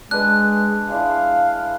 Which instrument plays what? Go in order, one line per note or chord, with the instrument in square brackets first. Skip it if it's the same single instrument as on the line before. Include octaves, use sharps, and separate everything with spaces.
[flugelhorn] G#3 [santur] D4 B4 [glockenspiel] F#6
[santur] G#3 D4 E4 [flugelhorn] F5